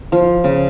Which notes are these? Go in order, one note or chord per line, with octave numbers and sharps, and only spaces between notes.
F3
C#3